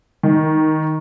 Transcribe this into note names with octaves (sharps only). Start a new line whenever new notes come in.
D#3